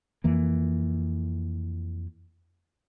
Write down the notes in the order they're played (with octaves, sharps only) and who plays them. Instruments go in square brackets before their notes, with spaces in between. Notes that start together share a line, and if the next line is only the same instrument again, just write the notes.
[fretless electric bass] F2 E3 A#3